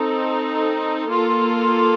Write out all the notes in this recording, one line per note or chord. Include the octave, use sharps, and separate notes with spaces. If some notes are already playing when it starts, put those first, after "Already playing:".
Already playing: C4 D#4 A4
A#3 F4 A4